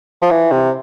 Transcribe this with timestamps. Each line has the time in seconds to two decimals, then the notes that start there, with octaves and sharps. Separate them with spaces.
0.22 F3
0.31 E3
0.51 C3